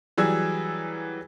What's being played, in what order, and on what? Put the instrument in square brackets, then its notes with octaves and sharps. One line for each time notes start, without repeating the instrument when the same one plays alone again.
[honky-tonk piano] E3 F#3 G3 G#4 E6 G#6